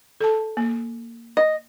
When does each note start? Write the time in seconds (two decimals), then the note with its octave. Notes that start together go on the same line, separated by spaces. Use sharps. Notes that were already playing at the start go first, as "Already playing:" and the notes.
0.21 A4 A5
0.57 A#3
1.37 D#5